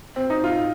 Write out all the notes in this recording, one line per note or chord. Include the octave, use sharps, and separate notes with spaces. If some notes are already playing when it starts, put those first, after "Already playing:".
C4
D#4
F4